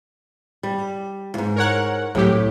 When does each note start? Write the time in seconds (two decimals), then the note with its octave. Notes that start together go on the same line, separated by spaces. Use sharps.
0.63 G3
1.34 D#2 G#2
1.56 A#4 C#5 F#5
2.15 C2 A2 F#3 G4